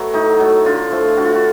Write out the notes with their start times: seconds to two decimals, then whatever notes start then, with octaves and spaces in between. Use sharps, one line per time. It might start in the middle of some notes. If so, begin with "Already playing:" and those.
Already playing: F#3 A3 B3
0.13 A2 D#4
0.39 F#3 A3
0.66 D3 F4
0.91 F3 A3
1.17 D3 F#4
1.25 F4
1.35 F#4